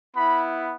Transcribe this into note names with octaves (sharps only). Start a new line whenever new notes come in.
B3 E4 B5